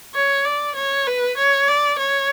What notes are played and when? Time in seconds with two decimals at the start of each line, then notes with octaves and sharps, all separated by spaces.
0.14 C#5
0.45 D5
0.76 C#5
1.07 B4
1.38 C#5
1.68 D5
1.99 C#5